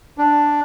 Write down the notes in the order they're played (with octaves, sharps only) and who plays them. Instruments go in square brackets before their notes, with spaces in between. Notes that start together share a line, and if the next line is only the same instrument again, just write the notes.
[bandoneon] D4